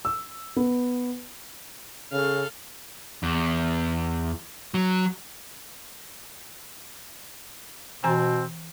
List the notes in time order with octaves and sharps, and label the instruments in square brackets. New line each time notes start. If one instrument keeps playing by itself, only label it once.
[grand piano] E6
B3
[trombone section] C#3 [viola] A4 F5
[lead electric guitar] E2
F#3
[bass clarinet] B2 [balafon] E3 G#5 A#5 [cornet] C4